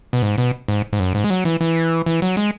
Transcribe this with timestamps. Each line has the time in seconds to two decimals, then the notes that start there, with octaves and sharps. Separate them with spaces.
0.13 B2
0.22 G#2
0.38 B2
0.68 G#2
0.93 G#2
1.00 F#2
1.15 G#2
1.24 G#3
1.30 F#3
1.45 E3
1.61 E3
2.06 E3
2.22 F#3
2.37 G#3